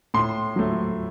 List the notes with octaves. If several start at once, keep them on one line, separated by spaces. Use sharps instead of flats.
A2 C6
F#3 A3